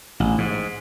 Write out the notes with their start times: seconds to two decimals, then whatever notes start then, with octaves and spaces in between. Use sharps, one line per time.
0.20 A1
0.38 G#2